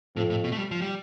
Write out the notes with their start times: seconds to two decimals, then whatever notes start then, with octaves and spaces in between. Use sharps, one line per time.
0.16 F2 A2
0.30 A2
0.44 B2
0.52 A3
0.57 G3
0.71 F3
0.82 G3